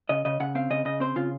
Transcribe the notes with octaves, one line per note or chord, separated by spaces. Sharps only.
C#3 D#5
C#3 D#5
C#3 F#5
C4 F5
C#3 D#5
C#3 D#5
C4 C5
C#3 F4